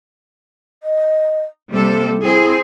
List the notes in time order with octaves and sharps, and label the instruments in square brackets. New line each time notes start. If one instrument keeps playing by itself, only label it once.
[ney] D#5
[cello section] C3 G3 A4 [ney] A#3
[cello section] C4 G#4 [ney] E4